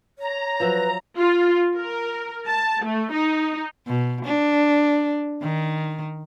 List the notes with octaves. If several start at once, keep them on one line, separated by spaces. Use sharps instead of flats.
C#5 A#5
F3 F#3 B4 E5
F4
A#4
A5
A3
D#4
B2
D4
D#3